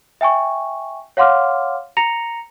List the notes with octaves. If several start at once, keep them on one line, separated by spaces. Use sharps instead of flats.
E5 G5 G#5 C#6
C#5 F5 F#5 C6 D6 F6
A#5 A#6 C#7 F7